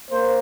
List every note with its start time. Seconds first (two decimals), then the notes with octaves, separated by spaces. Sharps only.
0.11 A#3 C5